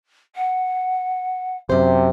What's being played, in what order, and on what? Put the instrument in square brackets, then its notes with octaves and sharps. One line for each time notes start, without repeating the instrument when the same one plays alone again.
[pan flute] F#5
[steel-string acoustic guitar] F#2 C5 [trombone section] C3